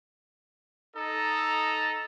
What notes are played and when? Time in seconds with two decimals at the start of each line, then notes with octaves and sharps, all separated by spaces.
0.95 D#4 A4 D#5 A#5